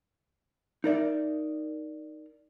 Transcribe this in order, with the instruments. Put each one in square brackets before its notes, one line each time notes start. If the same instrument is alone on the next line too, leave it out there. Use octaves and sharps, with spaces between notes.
[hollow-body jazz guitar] D#4 A#4 D5 E5